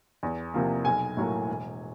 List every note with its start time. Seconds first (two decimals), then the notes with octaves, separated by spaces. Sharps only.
0.23 E2
0.54 C3 F3 A#3
0.85 B1 G#5
1.17 A2 F#3 A#3
1.48 E1